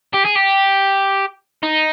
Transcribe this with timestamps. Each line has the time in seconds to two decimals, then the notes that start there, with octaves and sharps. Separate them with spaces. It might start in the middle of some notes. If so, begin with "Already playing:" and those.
0.13 G4
0.25 G#4
0.35 G4
1.63 D#4